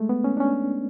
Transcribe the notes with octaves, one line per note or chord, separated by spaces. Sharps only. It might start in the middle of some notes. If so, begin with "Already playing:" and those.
Already playing: G#3 A3
B3
C#4
D4
C#4